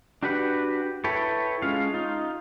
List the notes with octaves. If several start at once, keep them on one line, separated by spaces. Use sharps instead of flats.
D4 F#4 G4 B4 F#5
E4 A4 B4 C#5 G5
G#3 C#4 F4 F5
D#4 F4